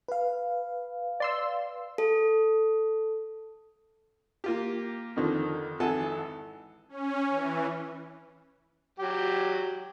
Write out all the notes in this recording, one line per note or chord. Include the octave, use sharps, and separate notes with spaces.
B4 F5
D5 C6 E6
A4
A#3 F4 G4
F2 D3 D#3 F3
G#1 F2 E3 A4 F#5 G#5
C#4
E3
F#3 G4